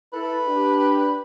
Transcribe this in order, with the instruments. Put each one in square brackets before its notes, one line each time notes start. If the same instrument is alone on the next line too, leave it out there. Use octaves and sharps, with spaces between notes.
[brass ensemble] E4 A4 [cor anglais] B4
[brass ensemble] D4 G4